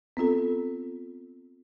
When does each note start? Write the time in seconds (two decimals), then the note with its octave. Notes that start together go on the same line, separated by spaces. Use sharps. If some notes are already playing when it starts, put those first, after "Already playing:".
0.17 B3 C4 F4 A4